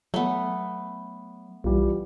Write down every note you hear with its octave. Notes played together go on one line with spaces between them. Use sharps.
F#3 A3 B3
B1 E3 G3 F4